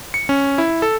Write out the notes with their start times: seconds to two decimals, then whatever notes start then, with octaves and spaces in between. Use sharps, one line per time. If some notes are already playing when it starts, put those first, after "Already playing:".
0.14 C#7
0.29 C#4
0.58 E4
0.82 A4